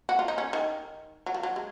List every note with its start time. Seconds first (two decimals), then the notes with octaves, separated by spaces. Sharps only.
0.09 F#4
0.19 F4
0.28 D#4
0.38 C#4
0.53 D#3
1.26 F#3
1.34 F3
1.43 F#3
1.56 G#3